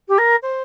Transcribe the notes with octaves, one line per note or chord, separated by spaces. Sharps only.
G4
A#4
C5